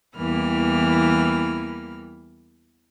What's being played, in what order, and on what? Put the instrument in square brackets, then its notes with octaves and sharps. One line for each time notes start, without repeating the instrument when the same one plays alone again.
[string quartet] E2 E3 G3 A#3 B5 F6